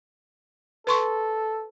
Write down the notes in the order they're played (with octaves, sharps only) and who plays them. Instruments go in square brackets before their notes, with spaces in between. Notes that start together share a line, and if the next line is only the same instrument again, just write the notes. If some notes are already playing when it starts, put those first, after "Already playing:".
[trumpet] A4 [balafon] B4 C6 C#6